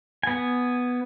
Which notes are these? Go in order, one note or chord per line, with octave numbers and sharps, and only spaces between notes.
B3 G#5